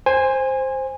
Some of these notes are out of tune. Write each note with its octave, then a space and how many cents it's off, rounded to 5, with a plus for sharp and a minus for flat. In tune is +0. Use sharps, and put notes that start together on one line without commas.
C5 +5 G#5 -20